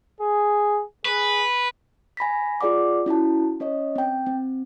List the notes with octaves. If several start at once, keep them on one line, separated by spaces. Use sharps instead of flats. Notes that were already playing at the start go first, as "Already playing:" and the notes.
G#4
G#4 B4
G#5 B5 A#6 B6
F4 G#4 D5 F#5 D6
C#4 E4 F#4 A5
C#4 C#5 D#5
C4 G5
C4